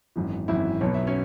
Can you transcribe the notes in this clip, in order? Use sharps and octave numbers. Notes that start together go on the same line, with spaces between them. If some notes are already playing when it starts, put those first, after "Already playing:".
G#1 F#2 E3
G#1 F#2 E3 E4 E5
B1 B2 F#3 B3 C#5
E5
C#4 C#5